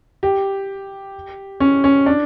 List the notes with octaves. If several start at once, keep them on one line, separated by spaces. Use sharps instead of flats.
G4
C#4
C#4
D4